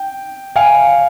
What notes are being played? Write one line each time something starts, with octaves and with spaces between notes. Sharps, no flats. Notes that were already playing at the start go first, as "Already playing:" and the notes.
Already playing: G5
F5 G#5